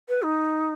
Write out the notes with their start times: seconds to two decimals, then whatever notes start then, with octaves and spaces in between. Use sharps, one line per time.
0.08 B4
0.22 D#4